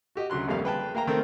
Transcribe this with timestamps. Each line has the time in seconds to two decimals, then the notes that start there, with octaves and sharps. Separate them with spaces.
0.15 F#4 G4 D#5
0.30 D2 C#3 F#3 C6 F#6
0.48 G#1 F2 G3 A#3 F5
0.64 G#4 B4 G5 A5
0.95 A#3 F5 G5 A#5
1.07 D#3 A3 C4 A#4